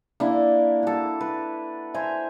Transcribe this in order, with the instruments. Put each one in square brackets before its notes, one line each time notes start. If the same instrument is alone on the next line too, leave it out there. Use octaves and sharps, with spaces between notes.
[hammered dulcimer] A#3 D4 E4
F#4 A4
B4
C5 E5 G#5 A#5